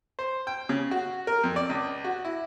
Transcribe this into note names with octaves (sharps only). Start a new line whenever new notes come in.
C5
G5
C#3
F#4
A#4
F2
D5
C#2
F#4
E4